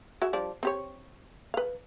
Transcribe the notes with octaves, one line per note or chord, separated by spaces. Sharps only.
F#4 G#4 E5
F3 G3 D4
C4 G4 C#5
B4 F5